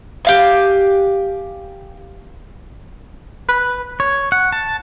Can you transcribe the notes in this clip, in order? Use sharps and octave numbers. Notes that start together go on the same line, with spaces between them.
G4 F5 G#5
B4
C#5
F#5
A5